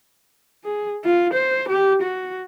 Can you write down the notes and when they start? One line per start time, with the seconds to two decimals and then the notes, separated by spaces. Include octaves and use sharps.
0.65 G#4
1.05 F4
1.34 C5
1.69 G4
2.02 F#4